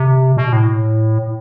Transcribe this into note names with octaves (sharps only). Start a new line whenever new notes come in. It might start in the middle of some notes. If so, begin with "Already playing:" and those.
Already playing: C3
B2
A2